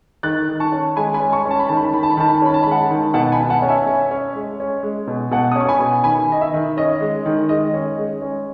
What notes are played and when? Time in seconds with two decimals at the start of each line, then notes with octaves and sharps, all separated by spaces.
0.23 D#3 F#6 A6
0.49 D#3
0.60 A5 C#6
0.72 C#4
0.96 G#3 G#5 B5
1.14 G#5 B5
1.20 C#4
1.32 A5 C#6
1.45 C#4
1.51 A5
1.59 B5
1.69 D#3 A5
1.77 B5
1.85 A5
1.94 D#3 B5
2.03 A5
2.11 B5
2.17 D#3 A5
2.28 B5
2.37 A5
2.42 C#4 B5
2.54 A5
2.63 G#3 B5
2.71 F#5 A5
2.91 D#3
3.14 B2 F#5 A5
3.32 G#5 B5
3.38 B2
3.50 F#5 A5
3.62 C#4
3.68 E5 G#5
3.87 C#4
4.11 C#4
4.36 G#3
4.60 C#4
4.83 G#3
5.07 B2
5.31 B2 F#5 A5
5.52 D#6
5.55 C#4 C#6
5.68 G#5 B5
5.80 B2
6.04 D#3 G#5 B5
6.29 D#3 D#5
6.41 E5
6.53 D#3
6.77 C#4 D#5
7.01 G#3
7.26 D#3
7.49 G#3 D#5
7.74 C#4
7.99 G#3
8.22 C#4